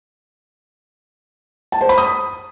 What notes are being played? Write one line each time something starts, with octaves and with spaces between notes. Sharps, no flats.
A5
C5
B5
D#6